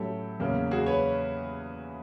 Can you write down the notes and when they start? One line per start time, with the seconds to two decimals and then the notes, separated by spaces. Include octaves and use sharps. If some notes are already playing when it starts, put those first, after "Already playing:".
Already playing: A2 F#3 A3 C#4 G4 A4
0.40 E2 C#3 F#3 A#3
0.71 F#4 G#4
0.86 B4 C#5